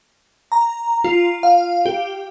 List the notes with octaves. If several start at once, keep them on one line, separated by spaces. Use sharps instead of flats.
A#5
F4
F5
G4